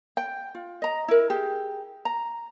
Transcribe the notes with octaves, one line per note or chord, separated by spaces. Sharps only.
G5
F4
D#5 A#5
E4 A#4
G4 G#4
A#5